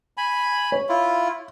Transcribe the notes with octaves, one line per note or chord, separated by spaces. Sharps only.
G#5 B5
C#5
E4 F4